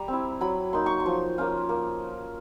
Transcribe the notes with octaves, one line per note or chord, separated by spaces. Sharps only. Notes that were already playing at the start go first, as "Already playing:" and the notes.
Already playing: G3 A#5
C4 E4
F#3 B5
A#3 D#4 C6
C#6
C6
F3
A#3 C#4 F4
A#3